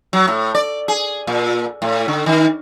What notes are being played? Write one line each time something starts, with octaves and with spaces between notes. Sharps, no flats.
F#3
A2
D5
G#4
A#2
A2
D3
D#3